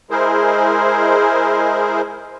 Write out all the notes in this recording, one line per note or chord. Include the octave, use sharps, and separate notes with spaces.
G#3 E4 G#4 A#4 C5